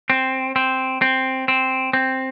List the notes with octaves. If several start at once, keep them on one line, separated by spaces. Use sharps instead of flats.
C4
C4
C4
C4
C4